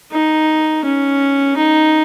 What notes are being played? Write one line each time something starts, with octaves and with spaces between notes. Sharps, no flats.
D#4
C#4
D#4